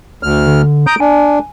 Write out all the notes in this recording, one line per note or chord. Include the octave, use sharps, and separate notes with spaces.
D2 F6
D3
A#5 D#6 G6 D7
D4 G#5